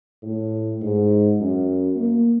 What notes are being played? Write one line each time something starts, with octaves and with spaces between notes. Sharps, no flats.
A2
G#2
F#2
A#3